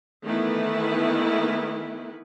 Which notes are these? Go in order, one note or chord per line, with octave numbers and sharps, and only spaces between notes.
D#3 E3 A3 B3 E4 B4